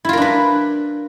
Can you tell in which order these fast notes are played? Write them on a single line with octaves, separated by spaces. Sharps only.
E4 F4 A#4 D4 B4